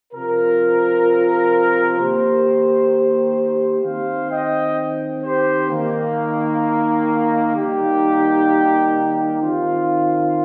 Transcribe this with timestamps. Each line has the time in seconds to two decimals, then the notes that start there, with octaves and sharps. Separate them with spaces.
0.13 C3 F3 C4 F4 A#4
1.99 D#3 A#3 G4 C5
3.84 D#3 C4 C5 F5
4.30 D#5 G5
5.23 G4 C5
5.70 D#3 A#3
7.55 D#3 G3 A#3 D#4 G4
9.41 D#3 C4 F4